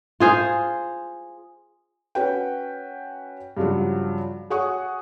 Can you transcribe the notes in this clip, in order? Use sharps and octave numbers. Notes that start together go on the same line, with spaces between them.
F4 G#4 C5
C#4 F#4 B4 G5
G2 C#3 F3 F#3 F#4
F#4 G#4 C#5 F#5 C#6 D#6